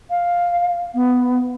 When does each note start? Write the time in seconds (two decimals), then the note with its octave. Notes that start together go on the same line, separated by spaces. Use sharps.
0.10 F5
0.94 B3